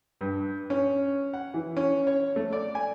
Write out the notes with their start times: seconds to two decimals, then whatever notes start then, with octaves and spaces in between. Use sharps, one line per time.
0.21 G2
0.70 C#4
1.33 F#5
1.54 E3
1.77 C#4
2.07 C#5
2.36 A3
2.53 D5
2.75 G#5